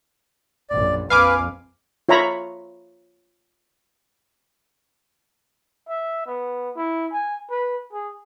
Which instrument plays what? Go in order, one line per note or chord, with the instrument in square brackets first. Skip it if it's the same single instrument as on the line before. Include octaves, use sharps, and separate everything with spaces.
[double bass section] A#1 F#2 [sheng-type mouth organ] D5
[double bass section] A#1 F2 [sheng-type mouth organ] B4 [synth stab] F5 G#5 D6
[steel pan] F4 C#5 E5 A#5 B5
[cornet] E5
B3
E4
G#5
B4
G#4